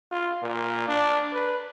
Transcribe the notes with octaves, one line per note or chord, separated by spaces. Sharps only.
F4
A#2
D4
B4